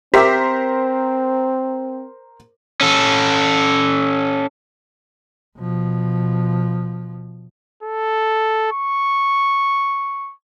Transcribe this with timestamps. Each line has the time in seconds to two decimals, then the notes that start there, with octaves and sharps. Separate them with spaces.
0.14 C4 G4 A#4 C5 E5 B6
2.81 C#4 A4
5.57 B2 F3
7.83 A4
8.72 C#6